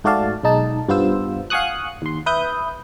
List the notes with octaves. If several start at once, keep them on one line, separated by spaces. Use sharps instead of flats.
G#2 A3 F#4 D5 F5 A5
B1 G#3 D#4 A5
G2 B3 F4 C5 E6
F5 F#5 G#5 C#6 D#6 F#6
D#2 C6
B4 E5 D#6 G6